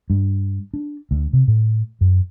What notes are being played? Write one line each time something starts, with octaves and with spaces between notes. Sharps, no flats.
G2
D4
D2
C3
A2
F#2